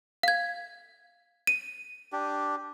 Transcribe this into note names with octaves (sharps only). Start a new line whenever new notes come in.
F5 G#6
D#7
D4 G4